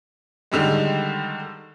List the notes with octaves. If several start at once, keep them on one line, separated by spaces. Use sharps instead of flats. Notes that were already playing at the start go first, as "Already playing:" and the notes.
D3 D#3 G3 G#3